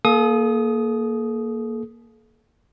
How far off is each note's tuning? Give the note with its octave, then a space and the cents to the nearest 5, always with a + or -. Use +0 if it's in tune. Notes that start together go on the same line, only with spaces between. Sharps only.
A#3 +0 A4 -45 D#6 +0